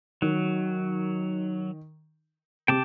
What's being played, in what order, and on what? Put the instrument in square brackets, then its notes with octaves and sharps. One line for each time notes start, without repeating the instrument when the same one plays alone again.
[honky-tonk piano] D#3 [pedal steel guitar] F#3
[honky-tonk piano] C3 [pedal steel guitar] G5 A5 D6